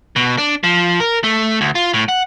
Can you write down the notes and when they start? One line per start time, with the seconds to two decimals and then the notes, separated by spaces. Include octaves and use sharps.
0.16 B2
0.38 D4
0.64 F3
1.00 A#4
1.24 A3
1.61 D2
1.75 F4
1.93 A2
2.09 F#5